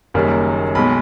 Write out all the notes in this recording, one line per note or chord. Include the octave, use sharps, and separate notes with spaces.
F#1 F#2 D#3 G3 A#3
B1 B2 G#3 B5